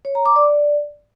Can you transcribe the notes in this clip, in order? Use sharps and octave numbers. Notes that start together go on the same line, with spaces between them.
C#5
A#5
D6
D5